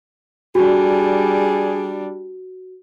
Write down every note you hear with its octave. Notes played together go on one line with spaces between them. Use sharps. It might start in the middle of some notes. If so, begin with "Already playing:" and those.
G3 D4 F#4 G#4